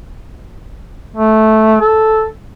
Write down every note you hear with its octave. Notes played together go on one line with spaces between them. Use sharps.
A3
A4